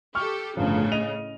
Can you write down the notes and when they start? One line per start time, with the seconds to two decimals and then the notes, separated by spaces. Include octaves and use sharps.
0.15 G4 A4 C#6 F6
0.57 G1 A2 C#3 F3
0.92 D#5 D#7 F7